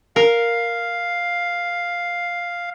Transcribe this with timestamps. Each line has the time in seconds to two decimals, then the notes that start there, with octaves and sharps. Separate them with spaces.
0.16 A#4 F5